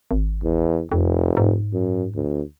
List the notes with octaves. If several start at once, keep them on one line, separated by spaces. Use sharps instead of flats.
G#1
E2
F1 F2
G#2
F#2
D2